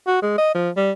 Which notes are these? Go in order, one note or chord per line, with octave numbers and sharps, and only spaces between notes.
F#4
G#3
D#5
F3
G3